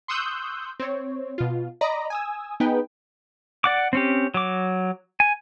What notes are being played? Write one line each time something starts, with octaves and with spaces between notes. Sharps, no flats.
C6 C#6 D#6 E6 F#6 G6
C4 C#5
B2 F4
D5 D#5 A#5 B5
G#5 D#6 E6
B3 D#4 G#4 B4 G5
D5 F#5 D6
C4 C#4 G4
F#3 D6
G#5